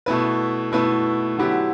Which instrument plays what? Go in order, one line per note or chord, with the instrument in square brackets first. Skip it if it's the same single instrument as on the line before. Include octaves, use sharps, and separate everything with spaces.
[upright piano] B2 A3 E4 B4
B2 A3 E4 B4
D3 F#3 B3 E4 G4